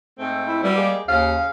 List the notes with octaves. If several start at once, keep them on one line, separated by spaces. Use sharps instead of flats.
G#2 A3 C4
E4
F#3 G3 E4 B4
G#3 A#3 G4
D#2 C#3 F5